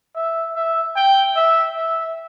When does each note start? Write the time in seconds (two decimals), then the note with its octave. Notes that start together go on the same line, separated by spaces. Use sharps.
0.15 E5
0.56 E5
0.96 G5
1.36 E5
1.76 E5